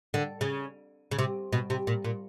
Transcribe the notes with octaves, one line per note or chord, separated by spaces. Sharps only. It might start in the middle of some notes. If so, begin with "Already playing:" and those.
D3
C#3
C#3
C3
B2
C3
A#2
A#2